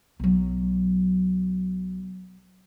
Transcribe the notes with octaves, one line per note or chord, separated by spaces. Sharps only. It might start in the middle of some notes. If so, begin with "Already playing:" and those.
B1 F#3